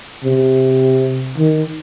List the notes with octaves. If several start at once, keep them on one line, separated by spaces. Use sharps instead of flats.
C3
D#3